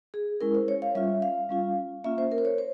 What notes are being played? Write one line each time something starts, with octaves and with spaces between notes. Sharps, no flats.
G#4
G#3 C#4 E4 A#4
C5
C#5
F5
G3 C#4 F4 E5
F5
G3 C#4 F4
A#3 C#4 F4 E5
C5
A#4
C5
C#5
C5